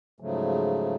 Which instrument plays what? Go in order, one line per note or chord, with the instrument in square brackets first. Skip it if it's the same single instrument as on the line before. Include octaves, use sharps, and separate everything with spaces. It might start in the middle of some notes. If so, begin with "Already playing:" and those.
[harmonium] G#2 C#3 F3 F#3 A3